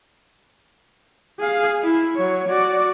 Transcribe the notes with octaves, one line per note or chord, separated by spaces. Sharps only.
G#4 F5
E4
F#3 C#5
F#4 D5